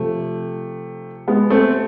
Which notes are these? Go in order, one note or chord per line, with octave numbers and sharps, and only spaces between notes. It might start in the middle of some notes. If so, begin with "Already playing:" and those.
Already playing: C3 F3 A3
G#3 B3
A3 C4